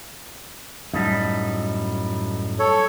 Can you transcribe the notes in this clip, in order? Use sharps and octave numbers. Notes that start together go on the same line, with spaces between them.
F#2 A2 G3 D#4 A4
A4 C#5